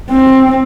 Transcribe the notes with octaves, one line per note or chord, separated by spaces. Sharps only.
C4